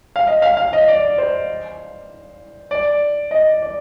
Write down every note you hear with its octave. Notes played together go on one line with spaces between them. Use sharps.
F5
D#5
F5
F5
D#5
D5
C5
D5
D#5
D5